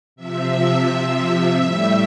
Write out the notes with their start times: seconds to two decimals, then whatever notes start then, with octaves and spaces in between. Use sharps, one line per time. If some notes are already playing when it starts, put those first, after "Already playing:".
0.16 C3 F3 E5
0.86 C3 F3 E5
1.55 A2 G3 E5